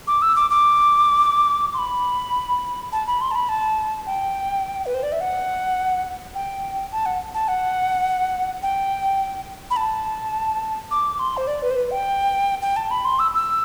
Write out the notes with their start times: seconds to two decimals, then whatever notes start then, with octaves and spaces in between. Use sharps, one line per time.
0.07 D6
0.22 E6
0.36 D6
0.50 D6
1.74 C6
1.78 B5
2.92 A5
3.07 B5
3.21 C6
3.31 A5
3.35 B5
3.49 A5
4.06 G5
4.86 B4
4.94 C5
5.03 D5
5.12 E5
5.21 F#5
6.35 G5
6.92 A5
7.06 F#5
7.34 A5
7.48 F#5
8.63 G5
9.71 B5
9.77 A5
10.91 D6
11.19 C6
11.37 C5
11.47 D5
11.62 B4
11.71 C5
11.76 B4
11.91 G5
12.62 G5
12.76 A5
12.91 B5
13.05 C6
13.19 E6
13.34 E6